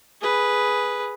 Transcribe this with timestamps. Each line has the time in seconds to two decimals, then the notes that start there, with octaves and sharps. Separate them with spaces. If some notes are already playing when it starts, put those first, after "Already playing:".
0.21 G#4 B4